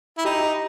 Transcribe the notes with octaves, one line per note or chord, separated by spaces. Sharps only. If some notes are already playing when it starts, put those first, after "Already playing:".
E4
D#4 G4